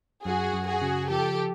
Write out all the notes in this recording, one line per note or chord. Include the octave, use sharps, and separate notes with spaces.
F#2 F#4 G#4
F#2
F#4 G#4
C#3
F3 G4 A4